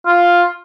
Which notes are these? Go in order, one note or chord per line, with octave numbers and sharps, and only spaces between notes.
F4